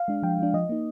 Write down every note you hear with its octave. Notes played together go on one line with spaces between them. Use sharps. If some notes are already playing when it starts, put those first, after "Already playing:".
Already playing: F5
G#3 D4
F3 G5
G#3 D4
F3 D#5
A#3 D#4